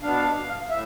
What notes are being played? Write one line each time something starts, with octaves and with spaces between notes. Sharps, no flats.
B2 B3 D4 F5
A2 E5